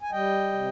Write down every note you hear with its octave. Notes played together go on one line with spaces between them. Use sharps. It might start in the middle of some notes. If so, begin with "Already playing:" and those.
G#5
G3 D#5 G5
C3